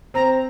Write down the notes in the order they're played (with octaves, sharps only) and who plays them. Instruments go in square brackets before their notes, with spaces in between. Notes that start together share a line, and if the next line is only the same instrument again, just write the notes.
[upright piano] C4 [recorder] A#5